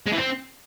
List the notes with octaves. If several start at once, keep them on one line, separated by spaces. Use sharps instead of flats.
G#3
E3
C4